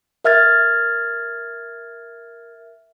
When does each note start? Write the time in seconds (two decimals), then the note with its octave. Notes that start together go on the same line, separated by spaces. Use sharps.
0.25 A#4 E5 F6 G#6 A6